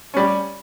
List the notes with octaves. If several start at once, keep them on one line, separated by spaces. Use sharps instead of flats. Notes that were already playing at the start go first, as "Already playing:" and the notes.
G3 C#4 G4